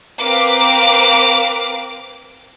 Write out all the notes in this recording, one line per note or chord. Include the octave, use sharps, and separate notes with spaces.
C4 A#4 B4 F5 D6